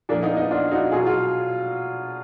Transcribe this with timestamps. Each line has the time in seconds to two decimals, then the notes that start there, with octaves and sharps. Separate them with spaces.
0.09 A#2 F3 A#3 D4
0.23 B3 D#4
0.37 B3 D#4
0.51 D4 F4
0.72 D#4 F#4
0.92 B2 F#3 F4 G#4
1.07 F4